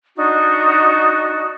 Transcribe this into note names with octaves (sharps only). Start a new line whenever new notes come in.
D4 D#4 F#4